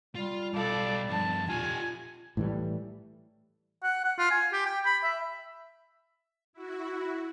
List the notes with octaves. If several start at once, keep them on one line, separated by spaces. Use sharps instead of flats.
G3 F4
B1 G3 A4 D5 F5
G2 F3 A5
A#2 F4 G4 G#5
A2 E3 G3
F#5
F#5
F4
G#5
G4
G5
B5
E5
E4 F#4